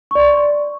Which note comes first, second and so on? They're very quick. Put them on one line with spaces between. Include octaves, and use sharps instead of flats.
C#6 D5 C6